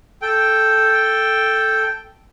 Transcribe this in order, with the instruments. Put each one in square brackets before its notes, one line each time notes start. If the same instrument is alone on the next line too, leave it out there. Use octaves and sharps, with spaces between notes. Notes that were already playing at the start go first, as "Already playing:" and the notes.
[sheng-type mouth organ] A4 G5